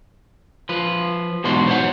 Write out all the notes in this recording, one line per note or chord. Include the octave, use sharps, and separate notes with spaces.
F3 B4
E2 G#2 B2 D4 F#4 C6
C5 C#5 F#5